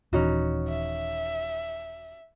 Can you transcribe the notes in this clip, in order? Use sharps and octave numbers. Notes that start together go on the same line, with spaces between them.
D#1 E3 C#4 D#4 F#4
E5